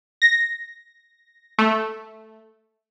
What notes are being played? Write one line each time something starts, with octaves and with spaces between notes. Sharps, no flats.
A#6
A3